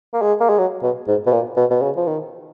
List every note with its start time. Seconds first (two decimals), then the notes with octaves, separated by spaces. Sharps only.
0.14 A#3
0.21 G#3
0.40 A#3
0.49 G#3
0.59 F#3
0.83 B2
1.08 G#2
1.26 B2
1.32 A#2
1.57 B2
1.70 B2
1.82 C#3
1.97 F3
2.07 D#3